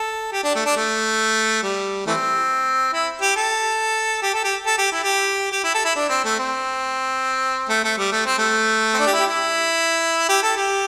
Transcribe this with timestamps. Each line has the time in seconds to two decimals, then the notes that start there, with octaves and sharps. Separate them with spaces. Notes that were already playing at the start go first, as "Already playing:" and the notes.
Already playing: A4
0.32 G4
0.43 D4
0.55 A3
0.66 D4
0.77 A3
1.63 G3
2.07 E3 A3 C4
2.93 E4
3.21 G4
3.36 A4
4.23 G4
4.34 A4
4.44 G4
4.66 A4
4.78 G4
4.92 E4
5.04 G4
5.52 G4
5.64 E4
5.75 A4
5.85 E4
5.96 D4
6.09 C4
6.25 A3
6.39 C4
7.69 A3
7.84 A3
7.98 G3
8.12 A3
8.26 C4
8.38 A3
8.94 C4
8.99 D4
9.07 G4
9.13 E4
9.20 G4
9.27 E4
10.29 G4
10.43 A4
10.57 G4